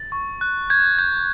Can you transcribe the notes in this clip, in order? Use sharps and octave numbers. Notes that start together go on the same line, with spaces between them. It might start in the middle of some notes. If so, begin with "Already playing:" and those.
Already playing: A6
C#6
F#6
G6 G#6
G6